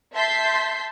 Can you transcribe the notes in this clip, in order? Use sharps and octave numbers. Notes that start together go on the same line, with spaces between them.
E5 A5 C6 G6 B6 C7